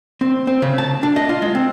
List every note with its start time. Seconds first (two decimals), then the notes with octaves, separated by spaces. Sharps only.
0.21 C4
0.47 C4
0.62 C#3
0.78 A5
1.03 D4
1.16 D#5
1.29 F4
1.42 G#3
1.55 C4